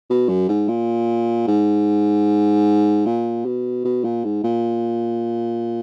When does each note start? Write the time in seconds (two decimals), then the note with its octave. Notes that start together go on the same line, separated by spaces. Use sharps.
0.10 B2
0.29 F#2
0.49 G#2
0.68 A#2
1.47 G#2
3.06 A#2
3.45 B2
3.85 B2
4.04 A#2
4.24 G#2
4.44 A#2